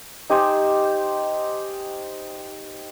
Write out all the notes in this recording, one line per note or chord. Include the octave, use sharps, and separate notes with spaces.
D#4 G4 C5 G#5